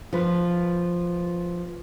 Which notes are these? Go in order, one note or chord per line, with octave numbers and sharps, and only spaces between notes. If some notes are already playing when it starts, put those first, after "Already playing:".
F3 F4 B4